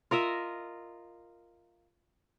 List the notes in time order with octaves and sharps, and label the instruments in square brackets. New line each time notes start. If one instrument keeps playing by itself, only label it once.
[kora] F4 A#4 D#5 E5